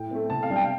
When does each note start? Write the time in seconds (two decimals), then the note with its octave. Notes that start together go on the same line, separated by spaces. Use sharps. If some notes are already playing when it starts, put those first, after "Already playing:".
Already playing: A2 G5
0.11 A3 C4
0.30 C3 A5
0.43 F5
0.50 G3 D4
0.56 G5